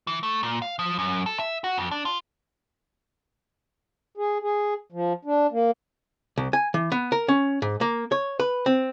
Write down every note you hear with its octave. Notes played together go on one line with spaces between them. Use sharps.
E3
A3
A#2
F5
F3
F#2
A4
E5
F#4
F2
D4
F4
G#4
G#4
F3
D4
A#3
C2
G#5
E3
B3
A#4
C#4
G#2
A#3
C#5
B4
C4